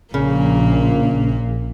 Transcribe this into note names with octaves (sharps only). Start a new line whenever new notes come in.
A#1 A#2 C#3 A#3